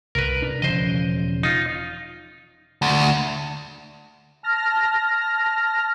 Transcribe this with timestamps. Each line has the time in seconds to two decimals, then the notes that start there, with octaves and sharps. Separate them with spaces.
0.15 C2 A#4 B4
0.42 D4
0.62 E1 C#3 F3 C5 D#5
1.43 D#4 F4
2.82 D2
4.43 A5 F6 A#6